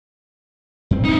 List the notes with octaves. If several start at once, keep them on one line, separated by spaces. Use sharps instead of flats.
F#2 C4
D#4 E4